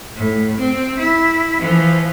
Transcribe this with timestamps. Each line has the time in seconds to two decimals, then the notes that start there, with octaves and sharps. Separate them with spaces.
0.16 A2
0.58 C4
0.98 E4
1.59 E3 F3